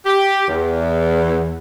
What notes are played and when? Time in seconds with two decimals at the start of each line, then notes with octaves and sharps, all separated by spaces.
0.06 G4
0.48 E2